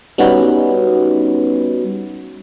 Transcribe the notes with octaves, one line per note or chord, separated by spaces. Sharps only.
G3 B3 C#4 D#4 F#4 B4